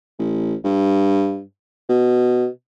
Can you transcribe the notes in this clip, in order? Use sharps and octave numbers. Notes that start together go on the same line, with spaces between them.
A1
G2
B2